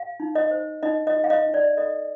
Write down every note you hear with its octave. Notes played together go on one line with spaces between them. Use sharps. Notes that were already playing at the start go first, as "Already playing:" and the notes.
Already playing: G4 F5
D#4
D#5
C5
D#4 D#5
D#5
G4
F5
D#5
D#4
D5
A4 D#5